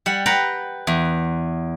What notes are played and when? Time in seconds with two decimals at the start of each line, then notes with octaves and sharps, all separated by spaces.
0.06 G3 F#5
0.26 B4 F#5 G5 A#5 B5
0.87 E2